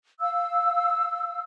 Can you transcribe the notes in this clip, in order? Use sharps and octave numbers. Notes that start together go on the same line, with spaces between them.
F5 E6